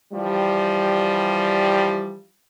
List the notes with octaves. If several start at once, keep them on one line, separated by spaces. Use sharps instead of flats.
E3 F3 G3